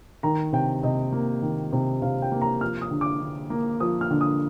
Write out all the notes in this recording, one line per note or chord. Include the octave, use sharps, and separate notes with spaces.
D#3 A#5
C3 G5
C3 D#5
A#3
D#3
C3
C3 F5
G5
A#3
A#5
F3 F6
D#6
D3
D6
D3
A#3
F3 D#6
F6
D3
D#6